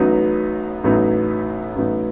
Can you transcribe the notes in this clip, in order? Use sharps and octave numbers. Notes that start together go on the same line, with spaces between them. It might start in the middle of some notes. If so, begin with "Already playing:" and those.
Already playing: A1 A2 F#3 B3 D#4
A1 A2 F#3 B3 D#4
A1 A2 F#3 B3 D#4